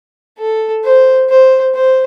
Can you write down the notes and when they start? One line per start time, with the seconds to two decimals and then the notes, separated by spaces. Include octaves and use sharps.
0.38 A4
0.84 C5
1.29 C5
1.75 C5